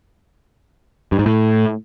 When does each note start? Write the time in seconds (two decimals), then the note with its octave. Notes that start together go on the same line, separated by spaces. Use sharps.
1.12 G2
1.19 G#2
1.26 A2